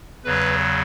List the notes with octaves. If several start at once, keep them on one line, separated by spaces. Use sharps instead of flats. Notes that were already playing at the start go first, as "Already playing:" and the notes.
E2 C#3 F#3 B4